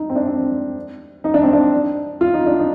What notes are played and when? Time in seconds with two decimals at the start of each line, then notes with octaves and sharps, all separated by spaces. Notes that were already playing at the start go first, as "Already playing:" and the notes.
Already playing: D#4
0.10 C4
0.16 D4
0.27 C4
1.24 D#4
1.34 D4
1.43 C4
1.53 D4
2.21 F4
2.34 D#4
2.46 D4
2.59 D#4